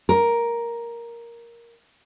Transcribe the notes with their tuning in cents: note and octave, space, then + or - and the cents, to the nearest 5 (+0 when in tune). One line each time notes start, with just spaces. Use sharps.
A#4 +5